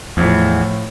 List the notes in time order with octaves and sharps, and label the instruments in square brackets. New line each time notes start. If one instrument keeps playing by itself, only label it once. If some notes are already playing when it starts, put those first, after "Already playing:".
[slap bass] E2 [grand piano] A2 F3